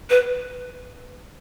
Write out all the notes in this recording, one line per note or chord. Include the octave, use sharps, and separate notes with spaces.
B4